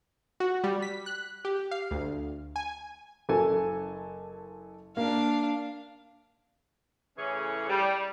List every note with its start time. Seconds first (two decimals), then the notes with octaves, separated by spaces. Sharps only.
0.40 F#4
0.64 G3
0.82 B6
1.06 F#6
1.45 G4
1.71 F5
1.91 D2
2.56 G#5
3.29 F#1 A4 G#5
4.97 A#3 D4 F5
7.18 A2 C#3 E3 C#4 G#4 C#5
7.69 G3